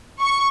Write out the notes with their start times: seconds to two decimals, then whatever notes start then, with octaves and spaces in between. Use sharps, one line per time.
0.21 C#6